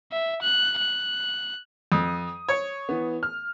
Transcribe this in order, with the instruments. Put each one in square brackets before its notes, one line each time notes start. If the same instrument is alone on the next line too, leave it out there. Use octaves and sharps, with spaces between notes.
[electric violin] E5
F#6
F#6
[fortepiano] F2 [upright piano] D#6
[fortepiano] C#5
[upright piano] E3 B3
F6